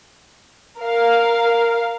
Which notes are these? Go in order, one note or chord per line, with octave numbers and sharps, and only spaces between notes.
A#4 F5